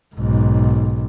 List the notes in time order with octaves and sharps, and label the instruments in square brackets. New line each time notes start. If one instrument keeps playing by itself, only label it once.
[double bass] B1 G#2